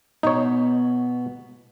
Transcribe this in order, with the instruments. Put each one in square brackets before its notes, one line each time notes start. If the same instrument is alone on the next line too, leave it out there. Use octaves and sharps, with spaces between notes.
[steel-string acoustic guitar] B2 B3 [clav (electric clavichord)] D#4 C#5